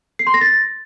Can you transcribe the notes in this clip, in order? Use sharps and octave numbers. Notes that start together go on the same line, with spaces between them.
C7
C6
A#6
A6